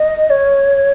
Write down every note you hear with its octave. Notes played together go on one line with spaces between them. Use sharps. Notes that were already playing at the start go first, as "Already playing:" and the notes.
Already playing: D#5
C#5